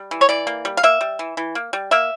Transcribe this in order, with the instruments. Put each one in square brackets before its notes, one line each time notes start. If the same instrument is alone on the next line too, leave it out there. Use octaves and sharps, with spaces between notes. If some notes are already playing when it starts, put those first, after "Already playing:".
Already playing: [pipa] G3
E3
C#5
E3 D5
A#3
G3
F5
A#3 E5
G3
E3
E3
A#3
G3
A#3 E5